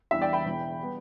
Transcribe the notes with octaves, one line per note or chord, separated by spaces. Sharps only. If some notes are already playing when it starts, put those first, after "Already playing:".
E2 E3 G3 D4 E5
D5 G5
G5 B5
E1 E2 E3
G3 B3